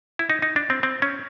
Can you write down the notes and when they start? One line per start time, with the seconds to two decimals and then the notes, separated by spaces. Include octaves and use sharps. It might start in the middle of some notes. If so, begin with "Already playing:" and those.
0.19 E4
0.30 D#4
0.42 D#4
0.56 D4
0.70 C4
0.83 C4
1.02 C#4